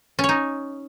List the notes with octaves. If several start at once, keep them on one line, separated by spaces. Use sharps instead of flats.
C#4
C#5
D#4